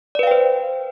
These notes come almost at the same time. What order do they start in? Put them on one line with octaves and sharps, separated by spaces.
D5 B4 F5 G5 C5